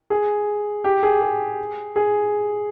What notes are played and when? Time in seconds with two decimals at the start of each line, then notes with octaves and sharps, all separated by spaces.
0.10 G#4
0.84 G4
1.03 G#4
1.22 G#4
1.96 G#4